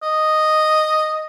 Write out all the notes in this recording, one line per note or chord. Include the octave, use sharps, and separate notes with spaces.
D#5